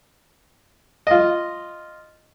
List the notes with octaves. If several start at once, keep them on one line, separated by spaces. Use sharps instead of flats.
F4 D#5